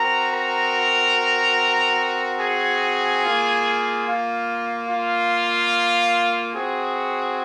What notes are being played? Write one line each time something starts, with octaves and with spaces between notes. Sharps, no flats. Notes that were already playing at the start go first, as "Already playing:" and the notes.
Already playing: C4 F#4 A#4 A#5
A#4 A#5
G#4 G#5
A#3 F4
F4 F5
F4 F5
C4 F#4 G#4